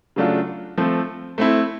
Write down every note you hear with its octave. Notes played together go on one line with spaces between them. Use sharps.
C#3 F#3 A3 D4 F4
F3 A3 C4
A3 C4 E4